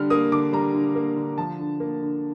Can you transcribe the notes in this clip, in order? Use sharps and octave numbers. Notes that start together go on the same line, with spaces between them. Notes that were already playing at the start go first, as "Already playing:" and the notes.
Already playing: D3 G3 F6
A#3 D#6
D3 D6
G3 A#5
D3
A#3
D3
F3 A5
D3
A#3
D3